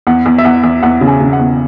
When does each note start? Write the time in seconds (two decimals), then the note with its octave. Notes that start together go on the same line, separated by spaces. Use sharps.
0.07 E2 F#5
0.26 E2
0.38 E5
0.45 E2 F#5
0.63 E2
0.83 E2 F#5
1.01 C#3
1.07 G#5
1.21 C#3
1.33 F#5
1.39 E2